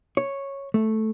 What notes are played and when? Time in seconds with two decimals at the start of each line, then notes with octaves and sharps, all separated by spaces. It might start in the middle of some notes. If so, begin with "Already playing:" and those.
0.17 C#5
0.74 A3